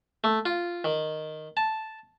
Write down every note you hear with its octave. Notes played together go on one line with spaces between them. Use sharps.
A3
F4
D#3
A5